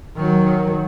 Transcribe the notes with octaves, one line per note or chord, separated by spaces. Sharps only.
D#3 F#3